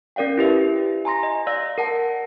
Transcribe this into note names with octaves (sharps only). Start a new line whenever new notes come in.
C#4 A#4 D5 F5 G5
E4 G4 B4 E5
G#5 A#5 C6 A#6
D#5
D5 F5 E6 A#6
A#4 F#5 A5